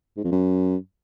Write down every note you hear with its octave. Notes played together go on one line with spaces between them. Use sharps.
G#2
F2
F#2